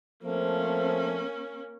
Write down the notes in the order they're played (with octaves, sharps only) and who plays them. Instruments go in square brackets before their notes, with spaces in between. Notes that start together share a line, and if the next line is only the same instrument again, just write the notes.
[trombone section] F3 A3 C4 [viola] A#3 C#4